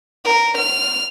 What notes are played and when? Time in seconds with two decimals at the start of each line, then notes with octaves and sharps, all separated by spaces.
0.25 A#4
0.57 F6